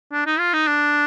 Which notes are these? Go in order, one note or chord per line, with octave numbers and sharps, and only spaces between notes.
D4
D#4
F4
D#4
D4